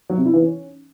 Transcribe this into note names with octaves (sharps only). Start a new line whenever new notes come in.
F#3
C3
E4
E3
C#4